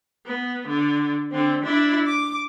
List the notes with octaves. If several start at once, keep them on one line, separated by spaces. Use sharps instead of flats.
B3
D3
D3 C4
D4 E4
D6